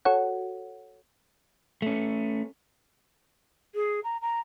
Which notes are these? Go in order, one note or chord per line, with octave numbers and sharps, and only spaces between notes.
F#4 A4 C#5 F#5
A3 C#4
G#4
A#5
A#5